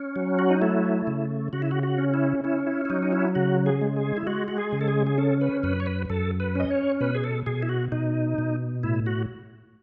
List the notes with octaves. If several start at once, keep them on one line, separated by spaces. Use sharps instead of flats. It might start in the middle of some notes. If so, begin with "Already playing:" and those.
Already playing: C#4
F#3
F#4
D#4
A3 E4
C#3
C#3 F#4
E4
F#4
F#4
C#4
E4
C#4 E4
E4
E4
F#3 D#4
D#4
E4
C#3 F#4
G#4
G#3
G#4
E4
G#3 F#4
F#4
G#4
C#3
A4
G#4
G#4
C#4 A4
B4
F#2 B4
C#5
B4
F#2 A4
B4
C#4 D#5
C#5
B2 B4
G#4
A4
B2 G#4
E4
F#4
B2 D#4
B2
A2 E4
F#4